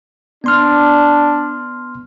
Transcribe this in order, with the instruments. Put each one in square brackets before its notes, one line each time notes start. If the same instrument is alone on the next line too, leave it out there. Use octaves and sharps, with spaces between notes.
[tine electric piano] B3 C6 F6 [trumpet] D4